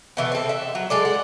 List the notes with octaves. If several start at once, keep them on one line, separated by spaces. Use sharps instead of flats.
B2 E3 A3
C4 A4
E5
F#3
G#3 A4 D5
F#5